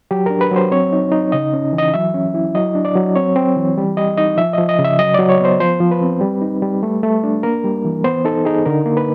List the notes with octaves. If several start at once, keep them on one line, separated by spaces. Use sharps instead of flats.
F#3 G4
D4 A#4
B4
F#3 C5
C4 C#5
D#4
D#4
C#3 D#5
C#4
E3
D#5
F#3 E5
C#4
E4
F#3 D#5
D4
D5
F#3
C4 C#5
C4
E3
G3
G3 D#5
D#4 D#5
F3 E5
F3 D#5
D#5
C#3
E5
F#3 D#5
F#3 D5
C#5
B3 C5
F3 C5
F3
B4
C4
G3
D#4
G3
A3
A3
D4
A#3 A#4
G3
E3
B3 C5
D#4 A4
D#4 G#4
D3 A#4
A#3
B4